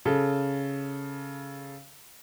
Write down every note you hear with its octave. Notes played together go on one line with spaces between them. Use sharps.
C#3 A4